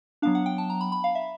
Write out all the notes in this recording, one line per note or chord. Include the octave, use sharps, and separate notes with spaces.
F#3 B3 D4 F5
F#5
G5
A5
A#5
B5
B5
F5
E5